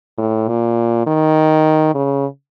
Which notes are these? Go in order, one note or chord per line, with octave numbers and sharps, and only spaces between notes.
A2
A#2
D#3
C#3